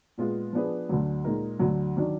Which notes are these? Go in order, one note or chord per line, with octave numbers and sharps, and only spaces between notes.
A#2 G#3 B3 F4
F3 B3 D4 G#4 B4
D2 D3 F#3
A#2 G#3 D#4 A#4
D2 D3 F#3
D#3 F#3 D4